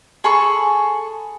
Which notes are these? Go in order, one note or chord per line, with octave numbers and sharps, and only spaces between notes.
G#4 A4 B5 C#6